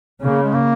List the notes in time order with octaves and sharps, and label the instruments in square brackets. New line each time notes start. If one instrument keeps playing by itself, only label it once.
[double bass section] C#3 [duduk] A#3
[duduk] G#3
A#3